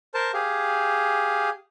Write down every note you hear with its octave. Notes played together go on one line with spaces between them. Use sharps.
A#4 C5 A5
G4 G#4 F5